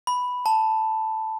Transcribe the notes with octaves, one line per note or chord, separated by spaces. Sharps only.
B5
A5